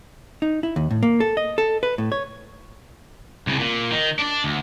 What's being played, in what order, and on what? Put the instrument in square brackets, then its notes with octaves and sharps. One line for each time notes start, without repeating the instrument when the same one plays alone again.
[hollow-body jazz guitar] D#4
E4
D#2
A2
A#3
A4
D#5
A4
B4
A2
C#5
[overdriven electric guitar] C2 C#3
A#2
D#3
D4 D5
D2